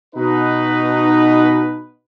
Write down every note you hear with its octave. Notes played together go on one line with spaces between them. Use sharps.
B2 D#4 B4